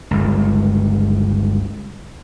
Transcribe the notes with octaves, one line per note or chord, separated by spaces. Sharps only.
G1 C#2